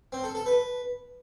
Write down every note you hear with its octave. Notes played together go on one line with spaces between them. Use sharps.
C4
A4
A4
B4